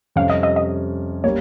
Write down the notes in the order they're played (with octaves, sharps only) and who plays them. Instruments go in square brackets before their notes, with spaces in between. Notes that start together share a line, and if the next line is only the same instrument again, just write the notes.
[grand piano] F2 C3 G3 C#4 [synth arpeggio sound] F5
[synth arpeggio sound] D#5
D#5
D#5
[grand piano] G3 A#3 [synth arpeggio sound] C#5